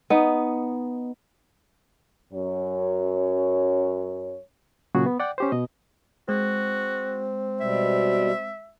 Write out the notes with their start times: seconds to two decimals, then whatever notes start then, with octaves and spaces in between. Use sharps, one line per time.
0.10 B3 D#4
2.33 F#2 C#5
4.95 A#2 C#3 F#3 F#4 G#4
5.06 B3
5.20 D5 F#5 G5
5.38 C#4 G4 C5
5.52 B2 D#5
6.29 G#3 C4 F#4
7.61 B2 G3 E5